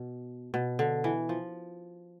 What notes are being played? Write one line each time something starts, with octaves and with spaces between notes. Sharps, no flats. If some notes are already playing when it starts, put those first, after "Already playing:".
Already playing: B2
B2
D3
E3
F3